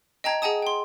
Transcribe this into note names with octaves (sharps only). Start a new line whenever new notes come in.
D#5 G5 A5 A#5 G#6
G#4 D#5 F#5 G#5 A5 D#6
G5 C6